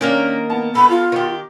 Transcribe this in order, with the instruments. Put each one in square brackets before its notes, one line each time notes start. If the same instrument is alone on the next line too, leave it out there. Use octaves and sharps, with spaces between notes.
[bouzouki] D#3 A#3 A#4 [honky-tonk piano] C#4 D4
[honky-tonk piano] B3 A5
[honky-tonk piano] B3 [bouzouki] A4 [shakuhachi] B5
[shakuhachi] F4
[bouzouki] D#3 G4